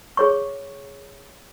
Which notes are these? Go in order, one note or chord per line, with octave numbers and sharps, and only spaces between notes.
G#4 C#5 C#6